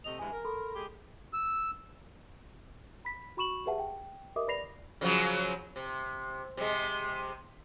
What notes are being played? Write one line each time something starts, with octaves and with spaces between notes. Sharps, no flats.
C3 A3 D#5 F7
G2 E3 G#3 G#5
A#4
A4 B5 C6
G#3 G4 G#4
E6
B5 B6
F#4 B5 C#6 E7 F#7
G4 G#4 B4 E5 F#5 A5
G5
G4 A#4 D#5 E5 D6 D#6
B4 D5 B5 A#6 C7 F7
C#3 F3 F#3
C3
C3 G#3